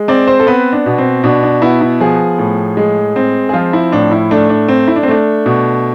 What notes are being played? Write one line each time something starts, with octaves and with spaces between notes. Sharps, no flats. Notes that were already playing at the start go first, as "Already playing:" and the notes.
Already playing: G#3
C4 D5
C5
A4
B3 B4
D4
B2
C4
B2 D4
D4
B3 E4
E4
F3 G#4
A2
G#3
C4
G#4
F3 F4
E4
A2 D4
E4
A3 D4
D4
C4
E4
D4
C4
A3 D4
B2